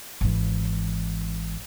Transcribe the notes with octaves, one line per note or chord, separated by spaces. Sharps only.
G#1 E3